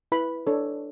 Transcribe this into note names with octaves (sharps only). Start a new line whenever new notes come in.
E4 B4 B5
D4 A4 C#5